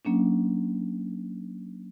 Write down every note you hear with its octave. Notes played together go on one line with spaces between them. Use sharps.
F#3 A#3 C#4 D4